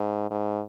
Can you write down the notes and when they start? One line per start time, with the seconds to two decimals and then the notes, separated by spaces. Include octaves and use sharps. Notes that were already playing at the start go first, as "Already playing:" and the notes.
Already playing: G#2
0.31 G#2